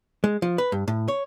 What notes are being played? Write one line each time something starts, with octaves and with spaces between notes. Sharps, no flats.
G#3
F3
B4
G2
A2
C#5